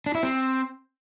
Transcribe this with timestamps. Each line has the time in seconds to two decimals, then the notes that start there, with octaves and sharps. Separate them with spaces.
0.06 D4
0.15 E4
0.23 C4